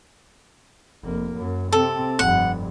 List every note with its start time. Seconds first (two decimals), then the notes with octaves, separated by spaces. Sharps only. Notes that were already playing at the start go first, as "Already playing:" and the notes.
1.04 F1 A#3
1.37 F#2
1.72 C3 C4 A4
2.19 F1 G2 F#5